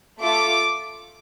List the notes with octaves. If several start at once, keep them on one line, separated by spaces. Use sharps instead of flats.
A3 F4 A4 D6